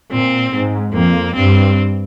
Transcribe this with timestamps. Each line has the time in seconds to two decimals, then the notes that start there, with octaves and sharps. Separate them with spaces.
0.12 A#2 C4
0.53 G#2
0.94 F2 A#3
1.35 G2 C4